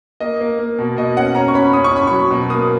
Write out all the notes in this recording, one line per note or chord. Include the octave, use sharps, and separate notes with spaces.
A#3 D#5
A#3
A#3
B2
B2 D#5
C#4 F#5
C#4 A#5
C#6
C#4 B5
C#4 D#6
C#6
C#4 B5
F#3 C#6
B2
A#3 D#6